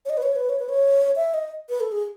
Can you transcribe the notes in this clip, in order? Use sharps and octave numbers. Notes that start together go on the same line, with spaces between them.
C#5
D#5
B4
C#5
B4
C#5
B4
C#5
E5
D#5
B4
A4
G#4